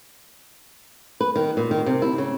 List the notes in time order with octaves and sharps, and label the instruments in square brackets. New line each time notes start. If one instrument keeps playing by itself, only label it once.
[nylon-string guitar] B4
D#3
A#2
D#3
C3
E4
C#3